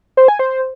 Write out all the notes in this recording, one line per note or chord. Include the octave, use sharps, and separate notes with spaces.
C5
G#5
C5